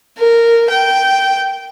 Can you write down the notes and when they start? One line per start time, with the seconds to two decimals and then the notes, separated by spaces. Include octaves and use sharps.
0.18 A#4
0.70 G5